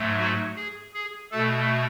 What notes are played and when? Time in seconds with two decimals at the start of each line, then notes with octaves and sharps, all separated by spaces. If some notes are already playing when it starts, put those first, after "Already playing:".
Already playing: G#2 F#3 A3
0.18 F#4
0.56 G#4
0.94 G#4
1.31 B2 A3 A4